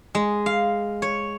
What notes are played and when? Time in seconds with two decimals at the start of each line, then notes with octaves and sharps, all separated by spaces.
0.15 G#3
0.46 F5
1.02 C#5